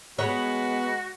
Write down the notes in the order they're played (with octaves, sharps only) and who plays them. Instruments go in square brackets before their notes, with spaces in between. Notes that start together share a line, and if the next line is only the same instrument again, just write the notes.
[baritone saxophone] G#3 [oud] B3 C#5 [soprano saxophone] F#4 [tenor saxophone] B4